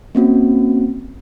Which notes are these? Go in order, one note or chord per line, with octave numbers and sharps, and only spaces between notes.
A#3 C4 C#4 F#4